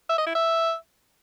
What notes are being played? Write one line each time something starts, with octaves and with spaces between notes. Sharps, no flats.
E5
D#5
E4
E5